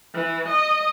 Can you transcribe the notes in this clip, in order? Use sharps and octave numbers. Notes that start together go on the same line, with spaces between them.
E3
D#5